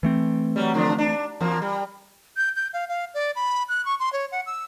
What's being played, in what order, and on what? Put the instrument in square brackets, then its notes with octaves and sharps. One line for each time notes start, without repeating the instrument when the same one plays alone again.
[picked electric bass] E3 A3 C4
[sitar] F#3 G3
D3 F3 D4
D4
E2 F3 A#3
G3
[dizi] G6
G6
F5
F5
D5
B5
F#6
C#6
C6
C#5
F#5
E6